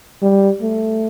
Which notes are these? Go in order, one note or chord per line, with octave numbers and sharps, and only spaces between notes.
G3
A3